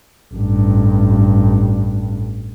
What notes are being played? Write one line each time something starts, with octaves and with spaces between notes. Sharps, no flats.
A1 G2